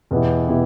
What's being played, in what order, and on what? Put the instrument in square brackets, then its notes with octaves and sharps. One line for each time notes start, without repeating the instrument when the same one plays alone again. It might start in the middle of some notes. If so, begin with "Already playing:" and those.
[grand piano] E2 B2 B3 E4 G4
B2 B3 E4 G4